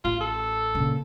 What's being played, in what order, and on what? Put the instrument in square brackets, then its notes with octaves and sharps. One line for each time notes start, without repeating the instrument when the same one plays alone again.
[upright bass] A1 [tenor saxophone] F4
[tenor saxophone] A4
[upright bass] A#2 C#3